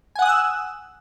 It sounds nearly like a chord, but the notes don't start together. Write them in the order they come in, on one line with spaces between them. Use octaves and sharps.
G#5 F#5 D#6 F#6 E6